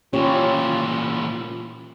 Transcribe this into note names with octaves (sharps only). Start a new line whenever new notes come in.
A#2 E3 C#4 F4 G4 C#5